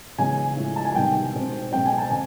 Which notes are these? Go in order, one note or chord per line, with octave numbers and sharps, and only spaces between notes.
C#3 E3 G#3 B3 G#5
A2 F3 G#3
A5
G#5
C3 D#3 G3 B3 G5
B2 G#3 C4
B2 G#3 C4 G5
G#5
A5
D3 G#5